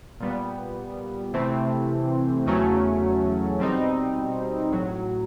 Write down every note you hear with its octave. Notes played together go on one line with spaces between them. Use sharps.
A#2 G3 B3
C3 E3 A3 C4
E2 C#3 F#3 A3 C#4
B2 G3 C4 D#4
A1 A2 F#3